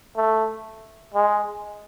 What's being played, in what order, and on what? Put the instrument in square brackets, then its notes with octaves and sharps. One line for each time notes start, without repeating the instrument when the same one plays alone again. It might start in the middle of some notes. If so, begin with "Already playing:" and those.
[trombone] A3
G#3